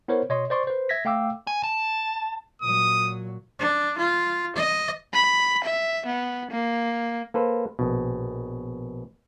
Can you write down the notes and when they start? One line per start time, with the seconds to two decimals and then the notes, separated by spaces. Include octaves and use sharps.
0.08 B3 E4 A#4 C5 C#5
0.29 B2 C#5 D#5 C6
0.50 C5 D5 C6 C#6
0.67 B4 C5
0.89 E5 G#6 A#6 B6
1.05 A3 F5 G5 D6 E6
1.47 G#5
1.64 A5
2.62 A#2 F#3 D#6
3.59 D4
3.98 F4
4.56 D#5
5.14 B5
5.64 E5
6.06 B3
6.51 A#3
7.34 A#3 A4 B4 C5
7.79 A#1 B2